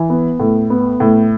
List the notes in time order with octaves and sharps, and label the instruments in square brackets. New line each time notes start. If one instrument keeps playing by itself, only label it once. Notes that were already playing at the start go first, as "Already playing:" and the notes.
Already playing: [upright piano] E3
B3
A2
B3
A2